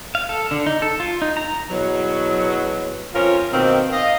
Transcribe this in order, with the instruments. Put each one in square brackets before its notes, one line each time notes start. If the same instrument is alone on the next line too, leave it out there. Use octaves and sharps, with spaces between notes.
[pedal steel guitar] F5
A4
D3
D#4
A4
F4
D#4
A#5
[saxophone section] E2 B2 F#3
F2 F3 C#4 F4 A#4
B2 D#3 A#3 C4
D#5 F5